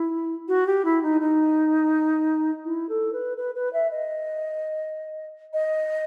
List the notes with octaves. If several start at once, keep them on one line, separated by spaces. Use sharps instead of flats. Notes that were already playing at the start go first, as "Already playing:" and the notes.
Already playing: E4
F#4
G4
E4
D#4
D#4
E4
A4
B4
B4
B4
E5
D#5
D#5